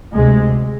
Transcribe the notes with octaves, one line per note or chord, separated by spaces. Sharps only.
D2 C3 G#3